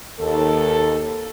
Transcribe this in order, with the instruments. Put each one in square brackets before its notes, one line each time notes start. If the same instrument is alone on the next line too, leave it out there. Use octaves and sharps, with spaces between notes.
[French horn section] D#2 [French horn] A4